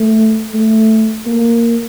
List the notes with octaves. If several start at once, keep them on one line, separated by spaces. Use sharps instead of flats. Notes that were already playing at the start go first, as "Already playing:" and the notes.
Already playing: A3
A3
A#3